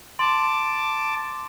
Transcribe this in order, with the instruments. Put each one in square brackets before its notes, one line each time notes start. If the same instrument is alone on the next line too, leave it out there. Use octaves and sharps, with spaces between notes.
[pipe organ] A5 D6 [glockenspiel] C6